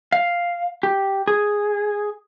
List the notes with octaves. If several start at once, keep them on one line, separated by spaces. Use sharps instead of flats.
F5
G4
G#4